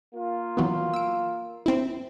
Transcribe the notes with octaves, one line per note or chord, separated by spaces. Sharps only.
A#3 F4
E3 F#3 B3
E6 D7
C4 E4